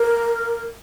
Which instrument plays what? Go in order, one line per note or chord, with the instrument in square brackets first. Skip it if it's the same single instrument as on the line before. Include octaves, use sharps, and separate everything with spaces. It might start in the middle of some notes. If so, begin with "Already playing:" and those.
Already playing: [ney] A#4